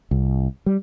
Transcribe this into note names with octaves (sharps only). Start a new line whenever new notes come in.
C2
G3